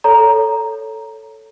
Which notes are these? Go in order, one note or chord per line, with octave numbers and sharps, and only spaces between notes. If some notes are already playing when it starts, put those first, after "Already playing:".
A4 C#5 A#5